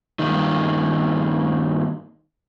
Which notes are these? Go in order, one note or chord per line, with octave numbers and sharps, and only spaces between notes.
G2 A#2 D#3